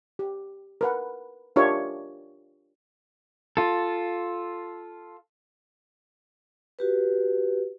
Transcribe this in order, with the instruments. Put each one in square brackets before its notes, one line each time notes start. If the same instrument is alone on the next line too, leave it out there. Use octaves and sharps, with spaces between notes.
[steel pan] G4
A#4 B4 F#5
D4 F4 G4 A#4 C#5 E5
[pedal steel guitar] F4 A4
[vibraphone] F#4 G4 B4